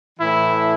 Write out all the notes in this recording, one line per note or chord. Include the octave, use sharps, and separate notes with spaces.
A2 E3 E4